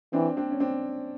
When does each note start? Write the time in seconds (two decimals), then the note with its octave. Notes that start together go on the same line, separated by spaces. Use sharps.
0.13 E3 C4 D4
0.37 C4 D4
0.51 C#4
0.60 C4 D4